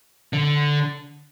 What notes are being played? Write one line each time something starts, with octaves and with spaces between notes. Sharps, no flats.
D3